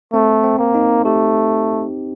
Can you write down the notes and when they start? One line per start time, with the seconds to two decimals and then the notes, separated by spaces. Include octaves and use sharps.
0.13 A3 C4
0.43 C4
0.58 A#3
0.74 D#4
1.04 A3 G4